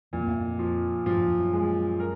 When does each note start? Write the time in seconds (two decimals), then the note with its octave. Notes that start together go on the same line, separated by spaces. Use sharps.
0.13 F2 A#2
0.27 E2
0.39 F2
0.59 F3
1.06 G2 F3
1.17 F#2
1.28 F2
1.39 F#2
1.53 G#3
2.00 A#4